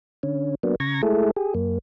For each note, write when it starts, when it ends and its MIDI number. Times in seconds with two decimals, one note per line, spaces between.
0.23 0.55 50
0.23 0.55 61
0.63 0.75 54
0.63 0.75 58
0.63 0.75 59
0.63 0.75 62
0.80 1.02 49
0.80 1.02 82
0.80 1.02 85
0.80 1.02 92
0.80 1.02 94
1.03 1.31 56
1.03 1.31 57
1.03 1.31 64
1.03 1.31 68
1.03 1.31 69
1.36 1.54 67
1.36 1.54 68
1.55 1.78 42
1.55 1.78 58